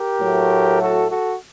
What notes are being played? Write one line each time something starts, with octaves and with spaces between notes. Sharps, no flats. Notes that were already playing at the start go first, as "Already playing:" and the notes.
Already playing: G4 A#4
A2 F#3 A3
F#4 A4
F#4 A4